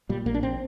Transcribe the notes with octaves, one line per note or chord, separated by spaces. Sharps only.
A#2 G3
A#1 A#3
D4
A#2 C4